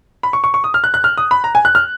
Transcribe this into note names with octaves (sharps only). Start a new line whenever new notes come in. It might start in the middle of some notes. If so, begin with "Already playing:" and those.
B5
C#6
C#6
C#6
D#6
F6
F#6
F#6
F6
D#6
B5
A#5
G#5
F#6
F6